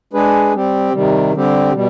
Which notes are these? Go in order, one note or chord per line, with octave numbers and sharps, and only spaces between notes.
G#3 D4 G#4 B4
G3 C4 G4
C3 D#3 G3
D3 G3 C4 G4
B2 G3